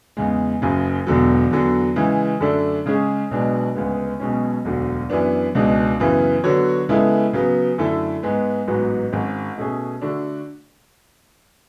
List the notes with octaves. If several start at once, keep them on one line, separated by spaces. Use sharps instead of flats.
E2 C#3 G#3
F#1 F#2 C#3
E1 E2 D3 F#3
E2 D3 F#3
C#3 E3 G#3
F#2 D3 A3 D4 A4
C#3 G#3 C#4 G#4
B1 B2 G#3 B3 D4
D2 C#3 G#3 B3
B1 B2 G#3 C#4
E1 D2 D3 F#3
F#2 E3 B3 D4
C#2 B2 G#3 D4
F#2 C#3 E3 B3
D3 F#3 B3 F#4 C#5
C#3 G#3 B3 E4 A4
C#3 F#3 B3
F#2 D3 A3 E4 A4
G#2 G#3 B3
A1 G#2 F#3 B3 F#4
G#1 G#2 G#3 C#4
B2 A3 C#4 G#4
D3 A3 D4 F#4